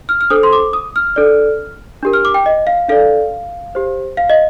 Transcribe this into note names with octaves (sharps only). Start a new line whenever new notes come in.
F6
F6
D4 A4 C5 D#6
C6
D6
D#6
F6
D4 A4 D5
D4 G4 A#4
F6
D6
G5
D#5
F5
D4 A4 D5 F5
G4 C5
F5
D#5